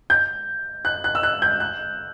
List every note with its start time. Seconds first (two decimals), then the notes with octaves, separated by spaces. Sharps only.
0.10 G6
0.85 F#6
1.04 F#6
1.15 E6
1.23 F#6
1.42 G6
1.60 F#6